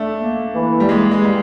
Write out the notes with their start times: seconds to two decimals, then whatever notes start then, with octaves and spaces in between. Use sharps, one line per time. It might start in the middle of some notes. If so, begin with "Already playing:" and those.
Already playing: A3 D4
0.20 A#3
0.55 E3
0.80 G3
0.89 G#3 A#3
1.11 G#3
1.24 G3